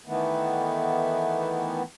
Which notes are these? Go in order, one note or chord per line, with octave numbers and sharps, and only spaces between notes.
D#3 E3 A3 B3